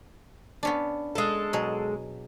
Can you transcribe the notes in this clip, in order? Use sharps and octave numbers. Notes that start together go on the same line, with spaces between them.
B3 C#4 D4
G#3 A4
B2 F#3 G#4